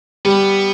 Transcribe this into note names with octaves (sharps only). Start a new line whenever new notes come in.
G3 B3